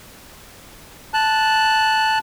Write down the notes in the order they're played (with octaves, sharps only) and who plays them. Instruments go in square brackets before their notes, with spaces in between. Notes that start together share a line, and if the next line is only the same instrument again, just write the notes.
[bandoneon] A5 F#6